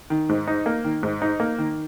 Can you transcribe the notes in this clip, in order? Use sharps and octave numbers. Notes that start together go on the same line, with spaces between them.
D#3
G#2
D#4
A#3
D#3
G#2
D#4
A#3
D#3